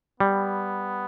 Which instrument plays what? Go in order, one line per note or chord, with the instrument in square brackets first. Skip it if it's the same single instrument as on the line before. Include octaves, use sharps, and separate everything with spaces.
[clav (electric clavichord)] G3 [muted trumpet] B3